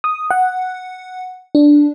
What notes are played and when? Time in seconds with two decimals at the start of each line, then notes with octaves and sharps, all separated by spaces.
0.04 D#6
0.31 F#5
1.55 D4